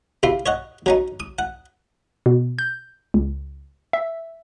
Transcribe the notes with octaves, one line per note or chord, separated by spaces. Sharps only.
C3 E4 F4
C#5 D#5 F#5
F#3 C#4 D#4
D#6
F#5
B2
G6
C#2
E5